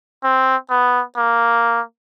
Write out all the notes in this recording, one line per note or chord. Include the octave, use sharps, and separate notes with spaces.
C4
B3
A#3